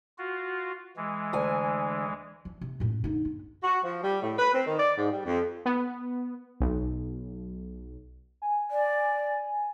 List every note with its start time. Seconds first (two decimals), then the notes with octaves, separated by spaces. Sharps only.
0.18 F4 F#4
0.97 E3 G#3
1.33 D2 G#5
2.45 F3
2.61 C3
2.80 F#2 A2
3.04 D3 D#4
3.25 B3
3.63 F#4
3.84 F3
4.04 G3
4.22 A2
4.38 B4
4.54 C4
4.67 D#3
4.79 D5
4.98 G#2
5.12 G3
5.26 F2
5.66 B3
6.60 B1
8.42 G#5
8.71 D5